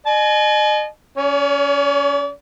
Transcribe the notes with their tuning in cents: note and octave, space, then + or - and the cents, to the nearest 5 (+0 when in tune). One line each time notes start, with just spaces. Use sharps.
D#5 -35 G#5 +40
C#4 +20 D5 -45